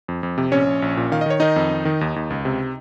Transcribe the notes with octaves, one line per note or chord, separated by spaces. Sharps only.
F2
F2
C3
A#1 C#4 C#5
A#1
A#1
A#2
D#3 F5
D#5
D#3 C#5
D#3 D#4 D#5
F2
D#3
D#3
D#2
D#2
C#2
C3